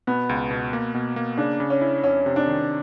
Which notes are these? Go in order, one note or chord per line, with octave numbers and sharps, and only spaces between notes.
B2 B3
C#2
B2
A#3
B2
A#3
C#3 D4
C#3
C#4
E4
F2 C#4
C3
D4
D#3